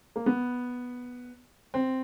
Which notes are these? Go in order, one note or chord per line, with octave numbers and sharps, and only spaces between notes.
A#3
B3
C4